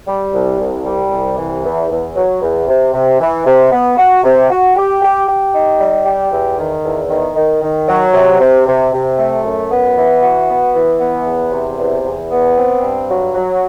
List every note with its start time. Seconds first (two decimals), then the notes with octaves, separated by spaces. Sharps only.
0.07 G3
0.34 C2
0.59 C2
0.85 G3
1.11 C2
1.38 E3
1.64 E2
1.90 E2
2.15 F#3
2.41 E2
2.68 C3
2.94 C3
3.20 E3
3.46 C3
3.72 B3
3.97 F#4
4.24 C3
4.50 F#4
4.76 G4
5.02 G4
5.28 G4
5.54 D#4
5.79 G3
6.05 G4
6.31 E2
6.58 D#3
6.84 E2
7.09 D#3
7.36 D#3
7.62 D#3
7.88 F#3
8.13 C3
8.40 C3
8.66 C3
8.92 C3
9.18 A3
9.45 F#2
9.70 B3
9.97 E3
10.23 F#4
10.49 B3
10.74 E3
11.00 B3
11.26 E2
11.52 C3
11.79 E2
12.04 E2
12.30 B3
12.56 C4
12.82 G2
13.08 F#3
13.35 F#3